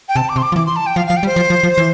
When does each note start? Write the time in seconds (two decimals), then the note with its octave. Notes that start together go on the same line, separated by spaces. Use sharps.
0.09 G5
0.16 C3 A5
0.29 D6
0.36 C3 C6
0.42 D6
0.52 F3
0.56 E3 D6
0.66 C6
0.76 A5
0.86 G5
0.96 F3 F5
1.07 F3 F5
1.17 G5
1.23 G3
1.26 C5
1.36 F3
1.50 F3
1.63 F3
1.78 E3